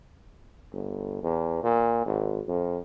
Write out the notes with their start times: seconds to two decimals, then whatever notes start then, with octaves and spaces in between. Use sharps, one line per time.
0.73 G1
1.23 E2
1.63 A#2
2.06 G#1
2.48 F2